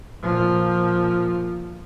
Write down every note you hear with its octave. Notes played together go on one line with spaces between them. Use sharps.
A#2 F3